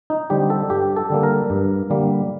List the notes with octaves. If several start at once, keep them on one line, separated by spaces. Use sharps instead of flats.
D#4
D3 G3 C4 G4
A4
G2 G4
A4
D3 G3 A#3
A#4
G2
D3 G3 A#3